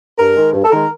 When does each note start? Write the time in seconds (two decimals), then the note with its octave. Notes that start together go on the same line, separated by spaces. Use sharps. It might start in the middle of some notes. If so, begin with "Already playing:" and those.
0.18 G2 A#4
0.35 D#3 G#3
0.53 G2
0.64 A4
0.71 D#3 G#3 A#4